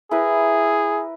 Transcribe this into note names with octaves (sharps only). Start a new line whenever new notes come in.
E4 G#4 A#4 B4